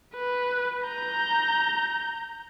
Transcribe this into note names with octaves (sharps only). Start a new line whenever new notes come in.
B4
A#5 G6